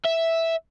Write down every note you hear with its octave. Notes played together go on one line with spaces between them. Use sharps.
E5